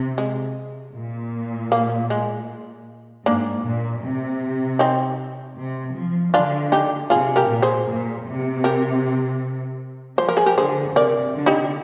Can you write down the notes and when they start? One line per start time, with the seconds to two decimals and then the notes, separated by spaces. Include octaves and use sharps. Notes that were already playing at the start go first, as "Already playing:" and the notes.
Already playing: C3
0.18 G#3
0.95 A#2
1.72 A#3
2.10 G#3
3.26 G#2 A#3 D4
3.64 A#2
4.03 C3
4.79 C4 D#4
5.57 C3
5.96 F3
6.34 D3 D4 F4
6.72 D#4 G4
7.10 C3 F4 G#4
7.36 G4 A#4
7.49 A#2
7.62 G#4 C5
7.88 A#2
8.26 C3
8.64 G4 A#4
10.18 F3 C5
10.29 A#4
10.37 G#4
10.46 G4 A#4
10.58 D3 G#4 C5
10.96 C3 A#4 D5
11.35 D3
11.46 D#4 G4